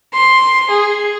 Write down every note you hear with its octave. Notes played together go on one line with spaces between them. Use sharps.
C6
G#4